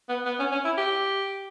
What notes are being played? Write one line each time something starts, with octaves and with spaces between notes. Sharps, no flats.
B3
B3
C#4
C#4
E4
G4